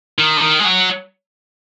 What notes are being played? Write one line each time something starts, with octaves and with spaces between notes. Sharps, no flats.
D#3
D3
D#3
G#3
F#3